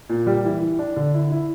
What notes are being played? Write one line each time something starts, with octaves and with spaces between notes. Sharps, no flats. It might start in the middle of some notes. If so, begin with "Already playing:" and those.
A#2
G3
E3
E3
D4
D3
E4
E4